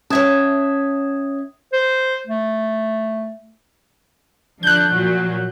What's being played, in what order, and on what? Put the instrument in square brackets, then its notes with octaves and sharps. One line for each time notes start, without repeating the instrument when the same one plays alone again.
[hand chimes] C#4 D#6 G#6 [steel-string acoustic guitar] C#5 E5 A5
[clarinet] C5
A3
[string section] D3 F3 D4 [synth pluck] F#6 G6
[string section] A#2 F3 F#3